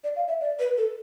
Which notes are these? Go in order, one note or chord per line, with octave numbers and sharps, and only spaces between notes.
D5
F5
E5
D5
B4
A4